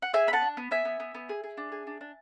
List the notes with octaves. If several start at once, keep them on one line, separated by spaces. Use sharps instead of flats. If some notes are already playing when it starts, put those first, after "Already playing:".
F#5
G#4 E5 G#5
B3 B5
F#5 A5
D4
B3
B3 E5 G#5
B3
B3
B3
G#4
G#4
D4
G#4
D4
D4